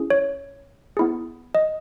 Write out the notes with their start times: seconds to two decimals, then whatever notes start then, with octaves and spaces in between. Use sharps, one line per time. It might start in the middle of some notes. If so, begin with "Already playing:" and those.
Already playing: C#4 E4 G#4
0.10 C#5
0.97 B3 E4 G#4
1.55 D#5